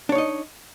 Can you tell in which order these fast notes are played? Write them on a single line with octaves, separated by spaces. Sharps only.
D4 C#5 D#4 D#5